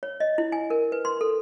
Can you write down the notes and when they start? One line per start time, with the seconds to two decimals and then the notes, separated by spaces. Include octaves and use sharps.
0.03 C#5
0.20 D#5
0.38 E4
0.52 G#5
0.70 A#4
0.92 B4
1.05 C6
1.21 A4